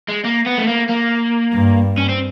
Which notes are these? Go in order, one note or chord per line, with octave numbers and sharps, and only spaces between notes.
G#3
A#3
B3
A3
A#3
A#3
G2
C#4
C4